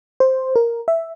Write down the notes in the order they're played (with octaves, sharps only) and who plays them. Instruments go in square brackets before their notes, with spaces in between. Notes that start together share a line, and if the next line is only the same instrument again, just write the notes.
[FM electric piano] C5
A#4
E5